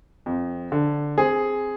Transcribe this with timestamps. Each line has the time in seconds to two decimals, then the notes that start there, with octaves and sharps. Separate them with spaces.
0.26 F2
0.72 D3
1.18 C4 G#4